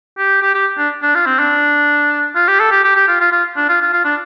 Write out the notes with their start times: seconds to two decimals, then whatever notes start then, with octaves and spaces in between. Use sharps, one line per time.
0.18 G4
0.42 G4
0.54 G4
0.78 D4
1.02 D4
1.15 F4
1.26 C4
1.39 D4
2.36 F4
2.48 G4
2.60 A4
2.72 G4
2.84 G4
2.96 G4
3.08 F4
3.21 F4
3.32 F4
3.57 D4
3.69 F4
3.81 F4
3.93 F4
4.05 D4